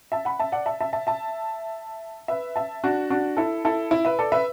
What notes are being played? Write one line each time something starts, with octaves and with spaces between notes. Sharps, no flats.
E5 A5
F#5 B5
E5 A5
D5 F#5
E5 A5
E5 A5
E5 A5
E5 A5
B4 E5
E5 A5
D4 F#4
D4 F#4
E4 A4
E4 A4
E4
B4 E5
A4 D5
B4 E5